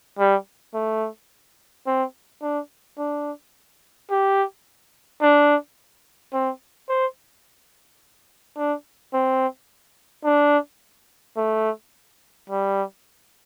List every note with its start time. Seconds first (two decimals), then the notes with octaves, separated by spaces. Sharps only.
0.19 G3
0.74 A3
1.87 C4
2.42 D4
2.98 D4
4.10 G4
5.22 D4
6.33 C4
6.89 C5
8.57 D4
9.14 C4
10.25 D4
11.37 A3
12.49 G3